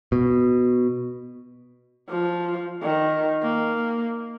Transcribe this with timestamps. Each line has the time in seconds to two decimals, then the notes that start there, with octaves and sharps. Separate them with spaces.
0.12 B2
2.09 F3
2.82 D#3
3.43 A#3